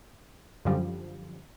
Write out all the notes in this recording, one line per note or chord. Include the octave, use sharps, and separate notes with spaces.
F#2 D3 F3 G3